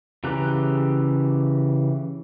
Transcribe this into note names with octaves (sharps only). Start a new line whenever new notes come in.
C#3 E3 G4 A#5 F#6